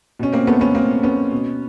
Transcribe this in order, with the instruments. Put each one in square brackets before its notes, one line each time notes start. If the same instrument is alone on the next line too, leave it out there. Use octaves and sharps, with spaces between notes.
[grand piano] B2 C#4
A#3 C4
A3 B3
B3 C#4
A#3 C4
B3 C#4
B2